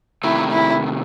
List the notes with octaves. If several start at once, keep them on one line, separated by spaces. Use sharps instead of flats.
C3 D#3 A3 E4
E4